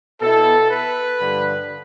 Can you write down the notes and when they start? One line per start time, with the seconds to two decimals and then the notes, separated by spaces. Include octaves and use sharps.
0.21 B2 B3 E4 A4
0.70 B4
1.19 G2 D3 F3